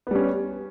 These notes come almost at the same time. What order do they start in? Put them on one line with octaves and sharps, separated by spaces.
B3 G3 C#4